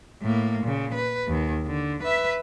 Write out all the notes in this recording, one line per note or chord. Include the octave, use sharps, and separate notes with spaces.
A2 A#3
A#2 C#3
B4
D#2 D#3
D3
B4 E5